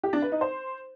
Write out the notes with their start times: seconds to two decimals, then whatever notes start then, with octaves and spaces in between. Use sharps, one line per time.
0.03 G4
0.13 D4
0.22 B4
0.32 D#4
0.41 C5